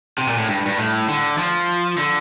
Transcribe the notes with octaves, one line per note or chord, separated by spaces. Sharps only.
C3
A#2
A2
G2
G2
A2
D3
F3
D3